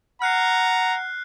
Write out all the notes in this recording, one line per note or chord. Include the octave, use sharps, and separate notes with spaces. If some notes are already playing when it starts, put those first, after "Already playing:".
F#5 A#5 F6 F#6 C7